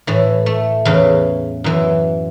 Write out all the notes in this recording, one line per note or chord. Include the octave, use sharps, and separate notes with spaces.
A2 E3
A3
E2 C#3 E3
F#2 E3